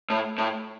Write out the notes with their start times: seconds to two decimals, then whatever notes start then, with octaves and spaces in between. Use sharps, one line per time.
0.10 A2
0.38 A2